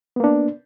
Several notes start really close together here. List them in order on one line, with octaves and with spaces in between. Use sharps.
B3 A#3 D4